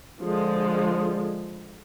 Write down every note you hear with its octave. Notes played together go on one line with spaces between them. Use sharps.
D3 F3 G#3